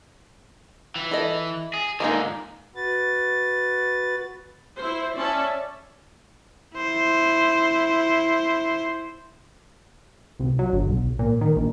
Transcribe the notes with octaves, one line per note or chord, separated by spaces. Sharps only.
E3
E4 A4 D#5
G#4
G#2 D3 G#3 A#3 D#4
F#4 B4 A6
E4 C5
C#4 D5 E5 A5
E4 C5
C2
F#3
G1
B1
A#2
D#3
A#1